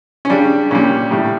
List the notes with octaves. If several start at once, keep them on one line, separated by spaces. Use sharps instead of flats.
C#4
C#3 G3 D4
A#2 G3 C#4
A2 G3